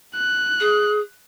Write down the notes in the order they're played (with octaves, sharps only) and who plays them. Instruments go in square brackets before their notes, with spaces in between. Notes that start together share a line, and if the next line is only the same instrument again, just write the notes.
[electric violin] F#6
[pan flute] G#4